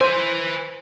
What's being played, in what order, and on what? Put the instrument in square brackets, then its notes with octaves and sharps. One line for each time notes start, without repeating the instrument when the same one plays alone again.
[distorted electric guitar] B4 G#5 [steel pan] C5